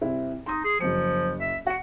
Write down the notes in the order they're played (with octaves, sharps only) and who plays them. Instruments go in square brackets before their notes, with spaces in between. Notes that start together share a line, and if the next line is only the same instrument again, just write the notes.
[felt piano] C2 C4 E4
[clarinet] D#4 [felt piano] C6 D#6
[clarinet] G#4
[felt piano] F#1 F#3 C#7 [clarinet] F3
[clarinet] E5
[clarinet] F#4 [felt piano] F#5 C#7